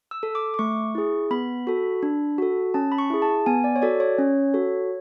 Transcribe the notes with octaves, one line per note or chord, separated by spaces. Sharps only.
E6
A4
D6
D6
A3 C#6
E4 G#4
B3 B5
F#4 A4
D4
F#4 A4
C#4 A5
B5
C#6
E4 G#4
A5
B3 G#5
D5
C#5
F#4 A4 D5
C#5
C#4
F#4 A4